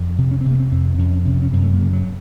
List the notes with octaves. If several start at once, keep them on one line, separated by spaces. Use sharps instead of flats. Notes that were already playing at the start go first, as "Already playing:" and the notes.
Already playing: F2
C3
C#4
C4
C3
A#3
C4
F2 C4
F2 C#4
C3 C#4
C#4
F#2 C4
A3
A#3
C#3
F#3